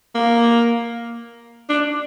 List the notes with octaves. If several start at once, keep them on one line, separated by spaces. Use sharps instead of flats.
A#3
D4